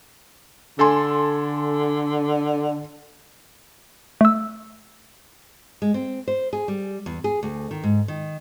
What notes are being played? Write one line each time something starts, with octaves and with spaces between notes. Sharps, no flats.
D3 A4 G#5 C6
A3 E6
G#3
C4
C5
G#4
G3
E2
G#4
D2
D#3
G#2
D#3